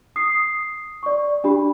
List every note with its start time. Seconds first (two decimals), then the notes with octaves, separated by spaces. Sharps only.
0.16 D#6 C7
1.03 D5 C#6
1.44 D4 G4 B5